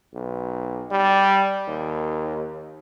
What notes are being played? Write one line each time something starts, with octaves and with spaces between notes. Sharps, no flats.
B1
G3
D#2